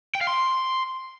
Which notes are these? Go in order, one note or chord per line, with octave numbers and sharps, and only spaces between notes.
G5
F5
C6